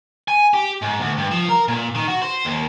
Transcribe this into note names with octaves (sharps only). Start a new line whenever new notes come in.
G#5
G4
G#2
D2
G2
F3
A#4
A#2
D#3
F#4
C5
D#2